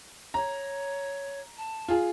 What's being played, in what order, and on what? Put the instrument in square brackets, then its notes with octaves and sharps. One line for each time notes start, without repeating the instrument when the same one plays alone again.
[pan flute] C#5 [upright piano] A#5
[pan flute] A5
[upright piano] F4 G#4